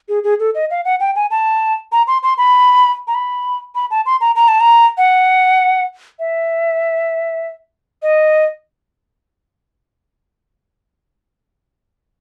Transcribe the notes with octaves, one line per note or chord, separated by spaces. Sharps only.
G#4
G#4
A4
D#5
F5
F#5
G5
G#5
A5
A#5
C6
C6
B5
A#5
B5
B5
A5
C6
A#5
A#5
A5
A#5
F#5
E5
D#5